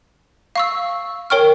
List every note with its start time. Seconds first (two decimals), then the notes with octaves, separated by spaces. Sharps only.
0.56 F5 C#6 E6
1.30 A#4 C#5 G5 C#6 F6